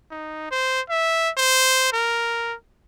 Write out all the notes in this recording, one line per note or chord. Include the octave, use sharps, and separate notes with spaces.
D#4
C5
E5
C5
A#4